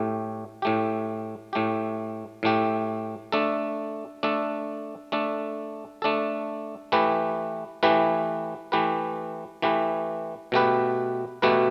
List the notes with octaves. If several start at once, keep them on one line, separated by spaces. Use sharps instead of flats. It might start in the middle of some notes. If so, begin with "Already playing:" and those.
Already playing: A2 A3 G4
A2 A3 G4
A2 A3 G4
A2 A3 G4
A3 D4 A4
A3 D4 A4
A3 D4 A4
A3 D4 A4
E3 A3 G4 B4
E3 A3 G4 B4
E3 A3 G4 B4
E3 A3 G4 B4
B2 A3 G4 B4
B2 A3 G4 B4